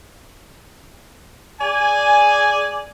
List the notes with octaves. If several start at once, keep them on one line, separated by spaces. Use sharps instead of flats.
G#4 D5 G#5